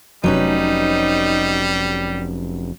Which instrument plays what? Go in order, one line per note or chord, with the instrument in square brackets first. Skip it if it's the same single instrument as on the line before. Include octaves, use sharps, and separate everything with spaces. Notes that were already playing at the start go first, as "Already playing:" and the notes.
[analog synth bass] F1 [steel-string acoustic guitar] F#3 C#4 B4 [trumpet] G3 [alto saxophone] D#4